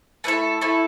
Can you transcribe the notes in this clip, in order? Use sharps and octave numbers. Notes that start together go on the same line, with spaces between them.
A3 E4 A4 B4
A3 E4 A4